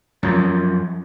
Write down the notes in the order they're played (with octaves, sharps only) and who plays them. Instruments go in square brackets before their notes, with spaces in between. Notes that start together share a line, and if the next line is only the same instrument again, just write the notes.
[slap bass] F#2 F3